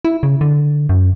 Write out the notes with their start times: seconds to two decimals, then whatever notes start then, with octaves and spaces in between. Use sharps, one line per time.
0.05 E4
0.23 C#3
0.41 D3
0.89 F#2